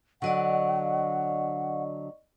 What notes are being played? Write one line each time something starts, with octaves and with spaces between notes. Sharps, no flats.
D3 F#3 D5 D#5 F#5 C#6